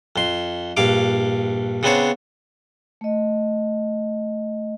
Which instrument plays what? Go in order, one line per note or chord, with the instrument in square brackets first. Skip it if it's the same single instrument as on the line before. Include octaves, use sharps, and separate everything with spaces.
[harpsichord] F2 C6
A#1 G2 F5 D6
C#3 B3 C4 D4 C5 C#5
[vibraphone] A3 D#5